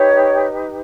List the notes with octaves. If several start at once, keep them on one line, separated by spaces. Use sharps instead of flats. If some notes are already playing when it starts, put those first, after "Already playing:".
Already playing: D#4 G4 B4 C#5